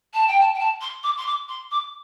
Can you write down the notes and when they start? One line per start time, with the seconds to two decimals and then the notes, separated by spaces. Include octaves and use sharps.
0.13 A5
0.27 G5
0.40 A5
0.54 G5
0.59 A5
0.81 C6
1.03 D6
1.17 C6
1.26 D6
1.48 C6
1.71 D6